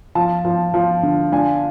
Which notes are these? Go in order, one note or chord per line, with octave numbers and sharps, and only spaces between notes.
F3 A5
F3
F3
D3
D4 G#5